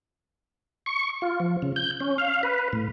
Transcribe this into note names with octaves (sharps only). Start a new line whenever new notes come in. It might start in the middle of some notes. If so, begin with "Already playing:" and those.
C#6
F4
F3
C#3
G6
C#4
F5
B4
A2